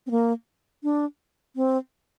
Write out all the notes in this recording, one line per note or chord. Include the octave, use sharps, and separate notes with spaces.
C4
A#3
D4
C4